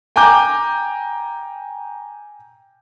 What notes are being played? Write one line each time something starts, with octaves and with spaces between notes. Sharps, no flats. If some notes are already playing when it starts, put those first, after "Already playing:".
G5 G#5 A#5 D6 G6